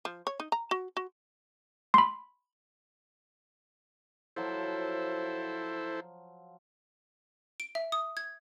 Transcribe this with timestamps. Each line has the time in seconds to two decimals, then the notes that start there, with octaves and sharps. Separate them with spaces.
0.05 F3
0.27 C#5
0.40 D#4
0.52 A#5
0.71 F#4
0.97 F#4
1.94 B5 C6
4.36 F3 F#3 E4 A4 C5 F5
7.60 D7
7.75 E5
7.92 D#6
8.17 G#6